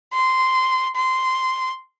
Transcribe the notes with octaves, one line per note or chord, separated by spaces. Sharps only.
C6
C6